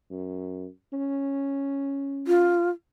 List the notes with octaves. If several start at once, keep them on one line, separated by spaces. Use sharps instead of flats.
F#2
C#4
F4